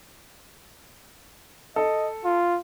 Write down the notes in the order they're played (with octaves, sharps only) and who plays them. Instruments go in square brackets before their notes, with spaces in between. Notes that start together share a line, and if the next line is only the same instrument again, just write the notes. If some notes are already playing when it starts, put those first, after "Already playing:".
[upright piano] A4 [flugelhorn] D#5
[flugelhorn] F4